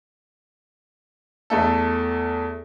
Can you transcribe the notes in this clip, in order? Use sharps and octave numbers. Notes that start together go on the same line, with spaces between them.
E2 A3 A4